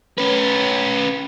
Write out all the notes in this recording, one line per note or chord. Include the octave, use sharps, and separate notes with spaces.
C#4 B4